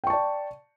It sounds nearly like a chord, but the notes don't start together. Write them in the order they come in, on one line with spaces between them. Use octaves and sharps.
G5 C#6 A5 D5